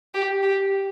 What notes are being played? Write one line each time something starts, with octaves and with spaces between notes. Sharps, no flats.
G4
G4